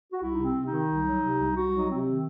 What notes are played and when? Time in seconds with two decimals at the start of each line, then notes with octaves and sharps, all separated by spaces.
0.12 F#4
0.21 C2 E4
0.34 C3 D#4
0.43 C4
0.55 C3
0.65 D#4
0.71 D#3
0.88 C2
1.05 F#3
1.22 C3
1.38 C2
1.55 C2 F#4
1.72 F#3
1.78 D#4
1.88 C3 C4
2.05 D#3